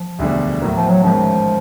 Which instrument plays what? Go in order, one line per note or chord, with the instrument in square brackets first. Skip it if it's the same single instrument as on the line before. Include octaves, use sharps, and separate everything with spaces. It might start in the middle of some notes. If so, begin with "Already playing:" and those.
Already playing: [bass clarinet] F3
[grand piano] E1 D2 D3 G3
A2 F#3 A#3
[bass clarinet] F3
F#3
[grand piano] A1 G#2 D#3 G#3 C#4 [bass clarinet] F3